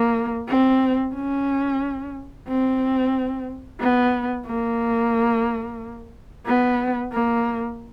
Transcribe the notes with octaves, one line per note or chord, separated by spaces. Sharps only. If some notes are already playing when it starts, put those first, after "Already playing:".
Already playing: A#3
C4
C#4
C4
B3
A#3
B3
A#3